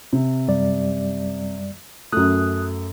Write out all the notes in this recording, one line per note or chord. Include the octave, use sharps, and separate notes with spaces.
C3
F#2 G3 D5
F#2 A3 D#6 F#6